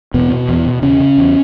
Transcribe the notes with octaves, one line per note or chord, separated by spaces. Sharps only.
E2 B2 B3
B2
E2
B2
E2 C#3 C#4
C#3
E2